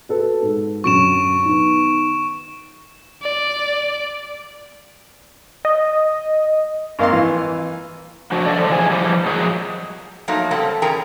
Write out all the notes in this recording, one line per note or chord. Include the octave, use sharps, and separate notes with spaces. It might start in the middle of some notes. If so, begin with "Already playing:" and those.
F#4 A4 B4
G#2
F#2 D3 F#3 C#6 D7 E7
D#3 B3
D5
D#5
G#1 A#3 F5 C6
E3
F3 D4 F#4
A4 D5 D#5
D3 F3
E3 F3 G#4 G#5
E3 F3 G3
F3 F#3 G#3 A#3 G#4 C5
F3 F#3 A3 A#3 D#4
C#3 G3 A#3 C4 A4
E2 C#4 G#4 A#4 G5 A#5